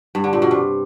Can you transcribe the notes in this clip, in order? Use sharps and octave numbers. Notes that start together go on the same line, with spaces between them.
G2
D3
A#2
B2
C3